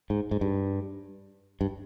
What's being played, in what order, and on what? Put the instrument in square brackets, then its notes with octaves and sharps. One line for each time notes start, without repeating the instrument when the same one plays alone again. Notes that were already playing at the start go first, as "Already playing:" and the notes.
[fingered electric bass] G#2
G#2
G2
G2